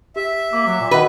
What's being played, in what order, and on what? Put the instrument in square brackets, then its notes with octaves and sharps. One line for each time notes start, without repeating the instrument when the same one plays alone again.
[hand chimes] G4 [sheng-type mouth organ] E5
[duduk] A#3 [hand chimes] D6
[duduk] F#3
A#2
[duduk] D#3 [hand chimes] F#4 D#5 F#5 [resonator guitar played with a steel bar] B4